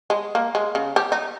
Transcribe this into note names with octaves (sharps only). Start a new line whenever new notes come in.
G#3
A#3
G#3
C#3
G4
D#4